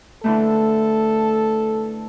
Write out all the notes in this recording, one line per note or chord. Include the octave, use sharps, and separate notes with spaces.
D3 E3 A3 A4